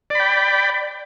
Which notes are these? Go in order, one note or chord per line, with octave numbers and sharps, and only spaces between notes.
D5 G5 B5